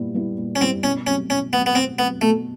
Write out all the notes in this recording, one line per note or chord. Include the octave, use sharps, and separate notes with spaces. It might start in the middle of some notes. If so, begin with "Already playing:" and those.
Already playing: A#2 G3 B3 E4
G3 B3 E4
A#2
C#4
G3 B3 C4 E4
B2 C#4
F#3 A3 C4 C#4
B2 C#4
F#3 A3 B3 C4
B3
B2 C4
F#3 A3 B3 C4
B2 A3